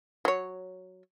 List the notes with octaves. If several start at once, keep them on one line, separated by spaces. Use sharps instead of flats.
F#3 C#5